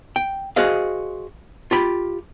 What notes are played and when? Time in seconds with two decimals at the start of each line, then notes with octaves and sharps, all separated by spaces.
0.16 G5
0.56 F#4 G#4 C5 D#5 F5
1.71 F4 G4 B5